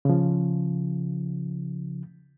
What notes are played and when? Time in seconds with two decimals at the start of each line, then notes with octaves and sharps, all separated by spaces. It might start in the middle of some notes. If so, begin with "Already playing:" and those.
0.05 C#3 F3